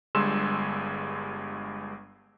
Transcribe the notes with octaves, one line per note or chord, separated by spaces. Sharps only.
G1 G2 G#3 C6 E6 E7